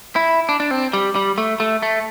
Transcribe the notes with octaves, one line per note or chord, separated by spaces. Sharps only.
E4
D4
D4
C4
G3
G3
A3
A3
A3